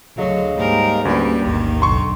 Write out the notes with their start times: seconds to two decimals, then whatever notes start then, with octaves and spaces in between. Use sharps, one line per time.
0.18 D2 D3 F#3 G#4 D#5 F5
0.57 G#2 G3 A#3 A#4
1.05 D2 G3 C#4 B4
1.46 A1 D#2 G#2 D#3
1.82 B1 F#2 D3 C6 C#6